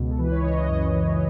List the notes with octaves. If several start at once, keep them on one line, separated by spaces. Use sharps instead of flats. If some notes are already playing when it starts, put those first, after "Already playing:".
Already playing: C#2 B2
A4
E3 B4
C#5
E3 D#5
D#5
F#2
E3